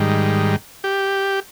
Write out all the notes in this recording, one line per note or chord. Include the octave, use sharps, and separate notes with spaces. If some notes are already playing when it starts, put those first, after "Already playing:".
Already playing: G#2 D#3 G3
G4